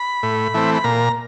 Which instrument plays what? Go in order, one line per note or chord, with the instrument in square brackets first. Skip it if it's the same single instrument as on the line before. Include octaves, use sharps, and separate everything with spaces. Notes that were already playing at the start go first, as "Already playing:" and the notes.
Already playing: [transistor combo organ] B5
A2
E3 A3 C4
B5
A#2 A#5